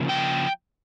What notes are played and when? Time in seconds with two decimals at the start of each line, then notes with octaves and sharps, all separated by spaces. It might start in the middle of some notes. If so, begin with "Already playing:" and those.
Already playing: C#3 F3 A#3
0.09 G5